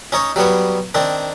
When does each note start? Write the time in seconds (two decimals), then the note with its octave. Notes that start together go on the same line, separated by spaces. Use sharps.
0.12 C#4 D#4 C#5
0.36 F#3 G3 B3 C#5
0.95 D#3 C4 D4